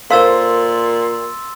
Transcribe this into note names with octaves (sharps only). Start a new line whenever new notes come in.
A#2 A4 A#4 C5 F5 C6 E6 A6